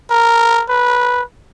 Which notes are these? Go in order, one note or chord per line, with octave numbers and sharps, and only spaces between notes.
A#4
B4